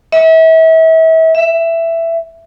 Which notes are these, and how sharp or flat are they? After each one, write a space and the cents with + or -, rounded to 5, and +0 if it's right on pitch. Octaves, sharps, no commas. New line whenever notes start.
E5 -35
E5 +10